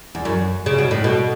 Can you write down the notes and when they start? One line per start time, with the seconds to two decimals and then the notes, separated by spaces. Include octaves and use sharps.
0.15 E2
0.25 F#2
0.66 C#3
0.78 B2
0.91 A2
1.04 B2